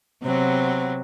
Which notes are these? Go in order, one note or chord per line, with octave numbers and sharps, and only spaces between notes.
C3 F#3 B3 C4